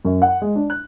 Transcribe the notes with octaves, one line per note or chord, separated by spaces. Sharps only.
F#2
F#5
G#3
D4
F#6